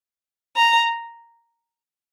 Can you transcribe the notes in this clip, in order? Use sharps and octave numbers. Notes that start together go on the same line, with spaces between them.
A#5